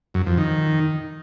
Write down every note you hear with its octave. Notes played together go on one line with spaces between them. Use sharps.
F#2
F2
D#3